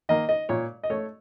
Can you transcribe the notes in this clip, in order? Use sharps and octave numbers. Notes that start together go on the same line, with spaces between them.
D#3 A#3 D#5
D#5
A#2 C#5
D#5
A3 C#5